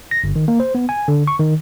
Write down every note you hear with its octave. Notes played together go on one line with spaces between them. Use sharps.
A#6
G1
D#3
A#3
C5
B3
G#5
D3
C#6
D#3